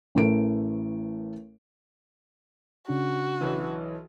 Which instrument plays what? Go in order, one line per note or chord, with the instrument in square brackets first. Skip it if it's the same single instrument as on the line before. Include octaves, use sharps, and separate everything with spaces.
[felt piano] A1 A2 E3 A3 A#4 D7
[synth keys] C#3 C#4 D4 [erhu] F#4
[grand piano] B1 E3